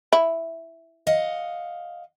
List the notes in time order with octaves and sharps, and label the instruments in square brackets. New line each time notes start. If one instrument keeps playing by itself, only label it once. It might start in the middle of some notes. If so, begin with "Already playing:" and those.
[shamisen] E4
[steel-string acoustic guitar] D#5 F5 F#5